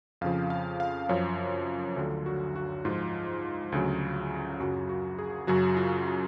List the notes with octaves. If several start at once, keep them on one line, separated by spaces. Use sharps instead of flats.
F2 C#3 F3 F5
F5
F5
F#2 F3 C#5
D2 D3 F#3 F4
F#4
F#4
G#2 F3 F4
D2 C#3 F#3
F#2 C#3 F#3 F#4
F#4
G#4
F#2 C#3 F#3 F#4
F4
F#4